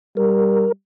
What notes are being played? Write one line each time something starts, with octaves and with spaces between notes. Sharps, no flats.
G3 A#4